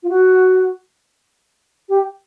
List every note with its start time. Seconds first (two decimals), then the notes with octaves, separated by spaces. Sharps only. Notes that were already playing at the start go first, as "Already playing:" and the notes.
0.03 F4
0.09 F#4
1.89 G4